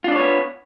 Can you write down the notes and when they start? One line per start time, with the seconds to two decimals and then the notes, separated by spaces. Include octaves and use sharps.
0.04 F4
0.08 D4
0.12 D5
0.16 C#5
0.19 B3